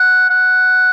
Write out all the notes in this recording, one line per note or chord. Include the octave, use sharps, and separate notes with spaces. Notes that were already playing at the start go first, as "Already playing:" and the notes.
Already playing: F#5
F#5